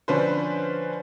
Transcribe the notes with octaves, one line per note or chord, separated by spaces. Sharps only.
D3 F3 C#4 D4 B4 C5